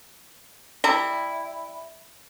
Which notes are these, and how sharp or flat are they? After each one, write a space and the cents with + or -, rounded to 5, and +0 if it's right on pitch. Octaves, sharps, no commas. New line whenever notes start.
G3 +10 E4 +0 A#5 -40